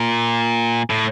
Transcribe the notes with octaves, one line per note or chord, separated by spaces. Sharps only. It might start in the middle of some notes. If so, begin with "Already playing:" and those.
Already playing: A#2
A2